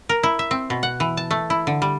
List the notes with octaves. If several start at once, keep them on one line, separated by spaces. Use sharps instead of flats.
A#4
E4
E5
C4
B2
F#5
E3
A5
A3
E4
D3
G3